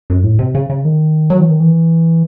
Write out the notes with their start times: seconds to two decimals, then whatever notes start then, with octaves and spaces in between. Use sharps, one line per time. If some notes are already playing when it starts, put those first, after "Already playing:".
0.10 F#2
0.24 A2
0.39 C3
0.55 C#3
0.70 C#3
0.85 D#3
1.30 F#3
1.40 E3
1.50 D#3
1.60 E3